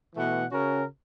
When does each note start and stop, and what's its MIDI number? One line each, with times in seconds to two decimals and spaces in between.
0.16 0.45 47
0.16 0.45 52
0.16 0.45 57
0.16 0.45 78
0.52 0.83 49
0.52 0.83 61
0.52 0.83 66
0.52 0.83 70